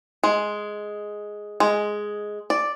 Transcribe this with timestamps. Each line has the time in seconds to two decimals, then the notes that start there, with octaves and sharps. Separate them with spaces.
0.24 G#3
1.60 G#3
2.50 D5